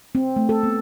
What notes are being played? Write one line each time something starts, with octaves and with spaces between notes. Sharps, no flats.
C4
A3
A4
B3